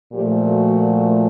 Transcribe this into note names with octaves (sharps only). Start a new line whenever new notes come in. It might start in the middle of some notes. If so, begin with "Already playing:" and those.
A#2 F3 A3 G4
F#4